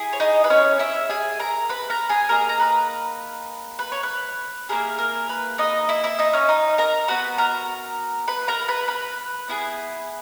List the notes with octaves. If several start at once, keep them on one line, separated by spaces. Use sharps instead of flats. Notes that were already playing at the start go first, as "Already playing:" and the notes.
Already playing: E4 G#4
C#5
D#4 D#5
B4
C#4 C#5
E4 E5
G#4 G#5
A#4 A#5
B4 B5
A#4 A#5
G#4 G#5
A#3 D#4 G#4 A#4 A#5
A#5
B4 B5
B4
C#5
B4
A#3 E4 G#4 A#4
A#4
B4
D#4 D#5
E4 E5
E4 E5
D#4 D#5
C#4 C#5
D#4 D#5
A#4 A#5
B3 F#4 B4 B5
A#4 A#5
B4 B5
A#4 A#5
B4 B5
B4 B5
B3 E4 G#4